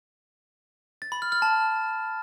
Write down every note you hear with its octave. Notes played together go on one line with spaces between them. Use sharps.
A6
B5
F6
F6
A5